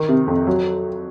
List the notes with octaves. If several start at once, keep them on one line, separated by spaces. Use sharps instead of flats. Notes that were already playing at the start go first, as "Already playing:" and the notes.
Already playing: D#3
C3
F2
F#3